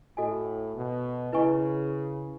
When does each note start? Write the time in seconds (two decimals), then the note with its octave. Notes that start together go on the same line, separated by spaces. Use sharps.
0.17 A2 F#4 A4 D#5 G#5
0.75 B2
1.33 C#3 E4 B4 D#5 G#5 C#6